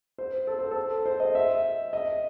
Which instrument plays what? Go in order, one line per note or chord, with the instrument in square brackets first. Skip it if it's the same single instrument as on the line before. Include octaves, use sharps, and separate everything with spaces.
[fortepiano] C5
A4
C5
A4
C5
D#5
E5
D#5